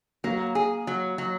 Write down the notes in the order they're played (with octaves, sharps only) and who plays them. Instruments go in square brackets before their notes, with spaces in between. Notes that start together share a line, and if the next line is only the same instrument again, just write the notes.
[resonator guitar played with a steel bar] F#3 [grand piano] A#3
[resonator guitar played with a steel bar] G#4
F#3
F#3